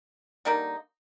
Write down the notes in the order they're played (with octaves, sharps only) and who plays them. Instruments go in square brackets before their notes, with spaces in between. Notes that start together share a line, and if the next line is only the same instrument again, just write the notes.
[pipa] D3 G3 A#3 D#4